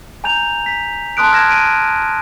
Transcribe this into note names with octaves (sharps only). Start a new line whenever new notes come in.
G#5 A#5 G6 F7
B6
A5 C6 D#6 F#6 D7
F6 G#6 A#6 E7
D7 D#7